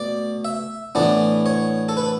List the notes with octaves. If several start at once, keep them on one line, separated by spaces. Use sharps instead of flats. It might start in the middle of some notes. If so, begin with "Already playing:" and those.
Already playing: B2 A3 D5
E5
A2 E3 B3 D4 D5
C#5
A4
B4